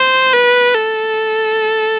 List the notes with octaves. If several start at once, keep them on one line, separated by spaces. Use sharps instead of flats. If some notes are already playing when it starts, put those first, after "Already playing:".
Already playing: C5
B4
A4